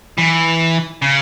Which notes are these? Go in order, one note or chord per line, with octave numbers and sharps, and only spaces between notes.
E3
C#3